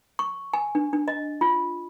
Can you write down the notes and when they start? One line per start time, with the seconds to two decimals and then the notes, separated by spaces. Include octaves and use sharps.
0.19 C#6
0.53 G#5
0.75 D4
0.93 D4
1.08 D#5
1.41 F4